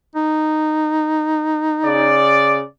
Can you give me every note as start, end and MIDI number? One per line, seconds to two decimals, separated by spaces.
0.16 2.22 63
1.83 2.61 49
1.83 2.61 74